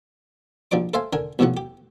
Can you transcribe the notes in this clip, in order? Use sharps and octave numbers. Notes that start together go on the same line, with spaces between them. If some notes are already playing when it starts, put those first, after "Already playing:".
A#1 F3 D#4 D5 D6
A4 C5 E5 F5 G#5
D3 A#4 G#5
B1 E2 A2 C3 F3 F#5
G4